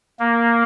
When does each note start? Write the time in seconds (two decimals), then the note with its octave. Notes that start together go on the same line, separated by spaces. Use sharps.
0.20 A#3